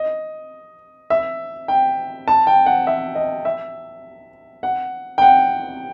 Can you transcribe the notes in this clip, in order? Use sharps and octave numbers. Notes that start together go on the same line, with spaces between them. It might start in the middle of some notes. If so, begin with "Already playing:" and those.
Already playing: D#5
E5
G5
A5
G5
F#5
E5
D#5
E5
F#5
G5
F#5